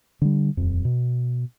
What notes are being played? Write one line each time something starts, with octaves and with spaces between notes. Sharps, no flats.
D3 G3
D#1 F2
B2